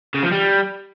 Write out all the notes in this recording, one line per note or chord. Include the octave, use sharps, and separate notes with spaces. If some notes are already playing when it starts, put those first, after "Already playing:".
C#3
F3
G3